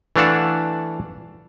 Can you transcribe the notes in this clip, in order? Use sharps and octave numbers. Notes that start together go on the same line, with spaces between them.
E3 A3 D4 F5 F#5 A5